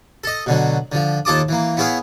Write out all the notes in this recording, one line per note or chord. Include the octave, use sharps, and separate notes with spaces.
A4 D#5
B2 D3 F#3
D3 F3
D#2 F4 A4 A5 D6 D#6
E3 A#3
B3 E4 G#4 C#5 F5